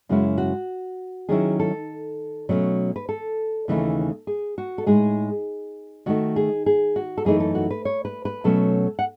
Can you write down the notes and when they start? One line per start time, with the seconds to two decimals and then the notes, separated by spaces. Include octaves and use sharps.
0.09 F#2 C#3 G#3 C#4 E4 F#4
0.38 F#4
1.29 D#3 F#3 C#4 E4 G#4
1.60 A4
2.49 B2 F#3 A3 C#4
2.96 B4
3.09 A4
3.68 D#2 C#3 E3 A3 D#4
4.27 G#4
4.58 F#4
4.78 A4
4.86 A2 G#3 D#4 G#4
6.06 D#3 A3 D#4 F#4
6.36 G#4
6.66 G#4
6.96 F#4
7.18 A4
7.25 F#2 E3 A3 D#4 G#4
7.40 A4
7.55 F#4
7.71 B4
7.85 C#5
8.05 B4
8.25 B4
8.44 B2 F#3 A3 C#4 A4
8.99 F#5